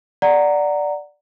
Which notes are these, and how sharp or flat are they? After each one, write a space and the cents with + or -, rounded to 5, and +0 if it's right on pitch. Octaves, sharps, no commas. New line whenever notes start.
D5 +0 F#5 +0 A#5 -10